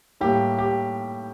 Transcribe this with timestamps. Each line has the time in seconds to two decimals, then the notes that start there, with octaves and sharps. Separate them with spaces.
0.21 A2 G3 A#3 G4
0.58 G4